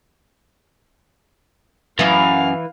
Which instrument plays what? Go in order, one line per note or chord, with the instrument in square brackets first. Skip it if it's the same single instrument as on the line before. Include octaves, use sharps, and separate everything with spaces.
[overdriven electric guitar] F#2 [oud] E3 E4 [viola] F5